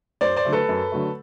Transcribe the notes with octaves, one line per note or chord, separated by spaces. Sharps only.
F#2 C5 D5
C5 D5
D3 F#3 A3
A4 B4
F#2
D3 F#3 A3